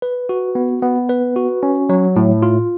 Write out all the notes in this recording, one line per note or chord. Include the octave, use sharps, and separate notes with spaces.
B4
F#4
B3
B3
B4
F#4
C#4
F#3
A2
F4